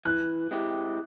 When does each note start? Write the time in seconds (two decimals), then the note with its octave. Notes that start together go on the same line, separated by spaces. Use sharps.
0.05 E3 F#6
0.51 G#3 C4 E4 G4